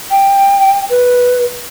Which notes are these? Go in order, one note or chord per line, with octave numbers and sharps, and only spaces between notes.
G5
B4